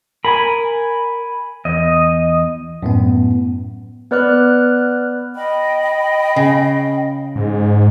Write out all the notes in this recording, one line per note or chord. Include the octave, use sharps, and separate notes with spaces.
A#4 G#5 B5
E2 D#5
F#2 A2 B3
B3 B4 D5 F6 F#6
D#5 G5 B5
C#3
G#2